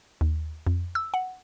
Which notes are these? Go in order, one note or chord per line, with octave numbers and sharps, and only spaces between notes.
D#2
F2
E6
F#5